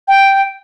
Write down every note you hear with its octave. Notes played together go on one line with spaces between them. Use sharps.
G5